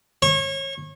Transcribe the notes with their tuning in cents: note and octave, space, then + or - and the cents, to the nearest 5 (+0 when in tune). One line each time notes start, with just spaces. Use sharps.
C#5 -30